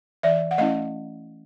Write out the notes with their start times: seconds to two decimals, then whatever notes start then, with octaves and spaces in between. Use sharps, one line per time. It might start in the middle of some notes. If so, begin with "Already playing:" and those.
0.23 E3 D5 E5
0.51 F#5
0.58 A3 C#4 E4 D#5 F5